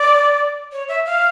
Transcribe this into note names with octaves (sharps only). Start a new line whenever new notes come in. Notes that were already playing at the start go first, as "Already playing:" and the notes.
Already playing: D5
C#5
E5
F5